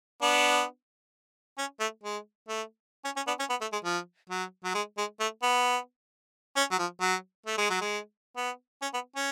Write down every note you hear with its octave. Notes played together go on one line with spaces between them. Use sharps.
B3 D4
C#4
A3
G#3
A3
C#4
C#4
B3 D4
C#4
B3
A3
G#3
F3
F#3
F#3
G#3
G#3
A3
B3
C#4
F#3
F3
F#3
A3
G#3
F#3
G#3
B3
C#4
B3
C#4